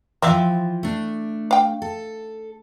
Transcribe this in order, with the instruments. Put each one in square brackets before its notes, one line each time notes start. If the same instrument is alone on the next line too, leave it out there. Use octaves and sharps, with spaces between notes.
[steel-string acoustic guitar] E3 F3 [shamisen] C4 E5 F5
[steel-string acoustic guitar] A3 D4
[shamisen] F5 G5
[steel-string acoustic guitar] A4